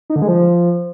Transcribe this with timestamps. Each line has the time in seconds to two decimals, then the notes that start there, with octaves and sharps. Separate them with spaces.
0.10 D#4
0.16 D3
0.22 G#3
0.28 F3